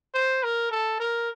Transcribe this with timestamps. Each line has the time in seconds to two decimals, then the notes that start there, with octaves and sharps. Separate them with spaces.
0.14 C5
0.43 A#4
0.71 A4
1.00 A#4